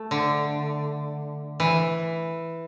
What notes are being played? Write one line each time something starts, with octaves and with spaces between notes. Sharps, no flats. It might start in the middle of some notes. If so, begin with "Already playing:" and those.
Already playing: A3
D3
E3